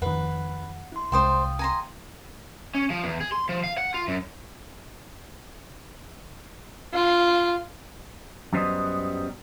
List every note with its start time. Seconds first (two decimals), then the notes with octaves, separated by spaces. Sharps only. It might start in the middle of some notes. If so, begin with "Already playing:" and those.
0.02 F2 D#3 B4 F#5
0.92 E4 C6
1.12 C2 G#3 C5 D5 F5 G5 C6 D#6
1.59 G#5 A#5 C6
2.75 C#4
2.90 F3
3.04 E2
3.21 G#4
3.32 C6
3.49 F3
3.64 F5
3.78 F#5
3.94 F4
4.08 F#2
6.93 F4
8.53 F#2 F#3 G3 B3 C5 D#5